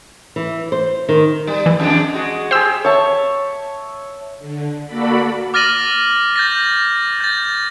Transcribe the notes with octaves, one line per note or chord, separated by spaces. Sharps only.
E3
C5
D#3
G3
E3
F2 G#3 D4
G#3 F#4
G4 G#4 C5 E6
C#5 E5 A5
D3
A#3 F#4 A4 D5 B5
D6 F6 A6 A#6 D#7 F#7
G6 A6 A#6
G6 A6